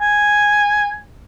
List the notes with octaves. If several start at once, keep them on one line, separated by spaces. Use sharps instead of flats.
G#5